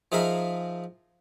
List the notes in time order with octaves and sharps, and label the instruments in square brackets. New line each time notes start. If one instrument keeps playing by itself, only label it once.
[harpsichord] F3 D#4 G#4 A#4 E5 F5